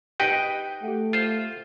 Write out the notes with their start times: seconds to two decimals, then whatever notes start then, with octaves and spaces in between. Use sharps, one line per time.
0.20 D#4 G4 B4 D#5 G5 F#6
0.83 A3 G4 F#5
1.13 F4 C5